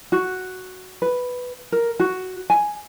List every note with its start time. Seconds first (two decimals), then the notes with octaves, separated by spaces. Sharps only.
0.12 F#4
1.02 B4
1.72 A#4
2.00 F#4
2.50 G#5